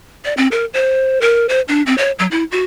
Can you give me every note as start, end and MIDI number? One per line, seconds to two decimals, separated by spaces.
0.25 0.33 74
0.37 0.48 60
0.52 0.65 70
0.74 1.21 72
1.21 1.46 70
1.49 1.61 72
1.68 1.82 62
1.86 1.96 60
1.98 2.11 73
2.19 2.27 54
2.31 2.44 64
2.51 2.64 66